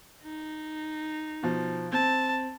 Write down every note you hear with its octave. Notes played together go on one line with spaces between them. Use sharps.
D#4
B2 F3
C4 A5